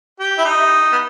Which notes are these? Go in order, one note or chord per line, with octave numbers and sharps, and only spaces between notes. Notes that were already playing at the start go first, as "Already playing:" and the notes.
G4
E4
D#4
B3